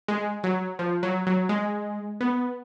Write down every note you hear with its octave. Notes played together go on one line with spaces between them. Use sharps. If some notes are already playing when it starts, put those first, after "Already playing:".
G#3
F#3
F3
F#3
F#3
G#3
B3